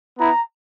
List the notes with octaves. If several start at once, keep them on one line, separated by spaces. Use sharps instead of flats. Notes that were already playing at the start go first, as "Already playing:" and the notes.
B3 E4 A#5